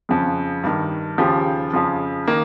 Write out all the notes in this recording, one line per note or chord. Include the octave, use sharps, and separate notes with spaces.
F2 C#3 F3
G2 D#3
D#2 C#3 F3 G4
F2 C#3 F3
D#3 A#3